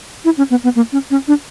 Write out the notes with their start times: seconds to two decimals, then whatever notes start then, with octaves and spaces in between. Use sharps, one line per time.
0.25 E4
0.38 C#4
0.50 B3
0.64 B3
0.76 A#3
0.93 C#4
1.11 C#4
1.28 D4